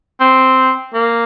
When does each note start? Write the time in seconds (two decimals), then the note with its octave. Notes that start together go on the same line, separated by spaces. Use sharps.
0.20 C4
0.94 A#3